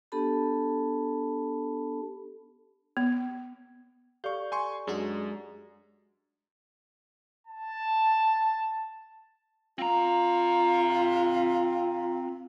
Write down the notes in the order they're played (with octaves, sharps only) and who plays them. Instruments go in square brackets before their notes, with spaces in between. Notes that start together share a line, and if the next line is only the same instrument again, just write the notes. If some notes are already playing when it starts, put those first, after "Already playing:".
[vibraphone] B3 D4 G4 A4 A5 B5
[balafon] B3
[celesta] G4 A4 D5 [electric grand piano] F5 C#6 [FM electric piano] G6
[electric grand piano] G#5 C6 C#6
[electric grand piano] F#2 [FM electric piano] G#3 D4 F#4
[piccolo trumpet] A5
[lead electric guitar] C4 A#5 [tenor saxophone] F4